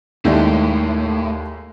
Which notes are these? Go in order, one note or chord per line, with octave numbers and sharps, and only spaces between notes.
D#2 A2 G#3 A3 E4 D5